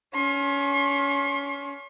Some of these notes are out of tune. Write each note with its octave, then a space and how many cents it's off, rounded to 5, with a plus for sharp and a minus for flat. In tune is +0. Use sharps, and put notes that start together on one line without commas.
C#4 +25 C6 +45